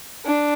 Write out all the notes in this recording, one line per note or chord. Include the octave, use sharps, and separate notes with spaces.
D4